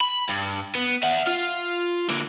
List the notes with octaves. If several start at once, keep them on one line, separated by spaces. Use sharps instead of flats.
B5
G2
B3
E5 F#5
F4
D3 A#3